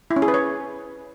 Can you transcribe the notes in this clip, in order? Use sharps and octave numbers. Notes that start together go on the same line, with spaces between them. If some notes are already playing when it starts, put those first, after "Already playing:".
E4
C#4
G#4
B4
C#5